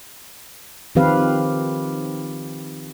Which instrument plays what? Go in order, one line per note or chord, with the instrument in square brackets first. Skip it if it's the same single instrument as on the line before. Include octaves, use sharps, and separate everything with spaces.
[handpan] D#3 F3 C4 G4 B4 F5